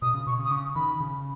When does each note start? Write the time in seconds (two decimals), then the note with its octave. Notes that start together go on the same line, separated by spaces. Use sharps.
0.02 B2 D#6
0.14 C#3
0.27 B2 C#6
0.39 C#3
0.44 D#6
0.51 C#3 C#6
0.75 D#3 B5
1.00 C#3